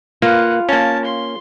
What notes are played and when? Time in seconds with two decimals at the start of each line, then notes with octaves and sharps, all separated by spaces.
0.22 A#3 F4 B4 F#5
0.69 A#3 C#4 A#4 A5
1.04 C6